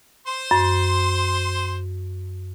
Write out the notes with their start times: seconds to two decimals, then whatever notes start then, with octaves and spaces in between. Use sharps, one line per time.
0.27 C5 C6
0.51 F#2